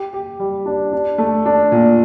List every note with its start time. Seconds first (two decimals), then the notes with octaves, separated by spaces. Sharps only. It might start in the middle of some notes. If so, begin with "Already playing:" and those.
Already playing: G4
0.13 G4
0.39 G3
0.66 D4
0.93 D4
1.18 A3
1.46 D4
1.72 A#2